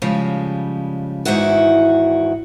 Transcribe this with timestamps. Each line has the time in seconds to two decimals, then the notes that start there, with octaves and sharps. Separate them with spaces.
0.02 C#3 F3 G3 G#3
1.25 E2 G#2 D#3 E4 F#4